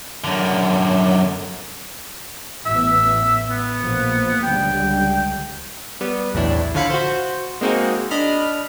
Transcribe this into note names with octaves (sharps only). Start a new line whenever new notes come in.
F#2 D3
A1 A2 B3 E5
B3
A#1 F3 A#3
C#2 D3 G3 G5
G3 B3
B1 E2 A2 D4 E4
D3 F3 C#5 F5 B5 C#7
F#4 C5
G#3 A#3 C4 D#4 F#4 G#4
D4 D#5 B5 F6